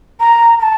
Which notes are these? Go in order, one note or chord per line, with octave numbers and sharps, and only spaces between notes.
A#5
A#5
A5